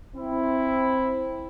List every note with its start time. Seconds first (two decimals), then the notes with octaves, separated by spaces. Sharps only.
0.15 C4 E4